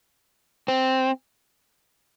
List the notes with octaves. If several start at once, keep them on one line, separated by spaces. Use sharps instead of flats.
C4